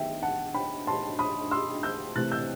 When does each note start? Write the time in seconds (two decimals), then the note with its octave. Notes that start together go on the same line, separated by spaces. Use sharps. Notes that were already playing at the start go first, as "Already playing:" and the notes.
Already playing: D#3 F#3 B3 E5 G5
0.22 F#5 A5
0.54 G5 B5
0.87 A5 C6
1.19 B5 D#6
1.51 C6 E6
1.83 E6 G6
2.15 C3 E3 A3 F#6 A6
2.32 E6 G6